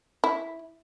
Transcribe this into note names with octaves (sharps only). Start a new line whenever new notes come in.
E4